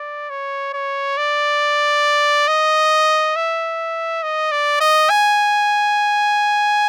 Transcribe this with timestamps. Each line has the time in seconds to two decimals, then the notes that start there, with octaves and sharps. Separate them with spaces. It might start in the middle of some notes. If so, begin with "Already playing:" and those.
Already playing: D5
0.30 C#5
0.74 C#5
1.17 D5
2.47 D#5
3.36 E5
4.23 D#5
4.51 D5
4.80 D#5
5.10 G#5